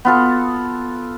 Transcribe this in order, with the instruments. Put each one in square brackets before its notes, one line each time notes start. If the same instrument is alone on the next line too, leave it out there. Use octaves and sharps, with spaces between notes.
[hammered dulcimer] B3 F4 A4